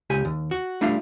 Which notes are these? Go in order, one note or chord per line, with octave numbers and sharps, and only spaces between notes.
C#2 G4 G#5
D#2
F#4
G3 A3 D4 F4 F5